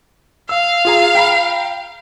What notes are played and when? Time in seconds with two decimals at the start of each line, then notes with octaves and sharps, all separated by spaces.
0.49 F5 E6
0.85 F4 G#4 A#5
1.15 G5 A#5 B5